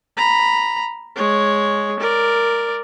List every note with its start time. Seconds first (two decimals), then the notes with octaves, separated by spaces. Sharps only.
0.17 A#5 B5
1.16 G#3 C#5
2.00 A#4 D5